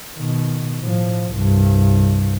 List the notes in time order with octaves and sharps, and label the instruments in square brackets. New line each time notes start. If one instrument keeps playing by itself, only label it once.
[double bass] B2 D#3
A2 F3
C2 G2